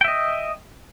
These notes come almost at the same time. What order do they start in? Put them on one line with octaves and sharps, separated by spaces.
G5 E5 D#5